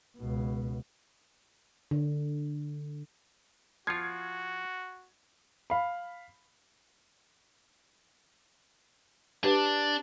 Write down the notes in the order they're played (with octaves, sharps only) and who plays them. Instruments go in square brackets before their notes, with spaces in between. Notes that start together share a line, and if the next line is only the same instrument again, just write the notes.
[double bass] C#2 B2
[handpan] D3
[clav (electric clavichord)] F3 F4 [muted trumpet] F#4 [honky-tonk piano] G#6 C7 C#7
[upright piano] F5 B5
[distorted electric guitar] D4 [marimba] G4 B4